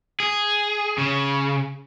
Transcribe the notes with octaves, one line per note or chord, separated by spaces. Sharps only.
G#4
C#3